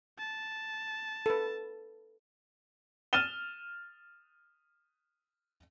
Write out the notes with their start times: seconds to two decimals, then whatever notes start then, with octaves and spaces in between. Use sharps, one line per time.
0.19 A5
1.26 A4 B4
3.13 F6 A6 D#7 E7 G7